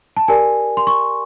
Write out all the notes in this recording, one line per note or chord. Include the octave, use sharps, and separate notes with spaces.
A5
G4 A#4 D5 G#5
C6
C#6